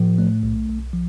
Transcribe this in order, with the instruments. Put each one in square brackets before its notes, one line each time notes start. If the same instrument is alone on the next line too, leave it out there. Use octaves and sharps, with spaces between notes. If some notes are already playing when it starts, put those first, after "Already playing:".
Already playing: [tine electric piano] A2 F3
A3
B1
B1
F3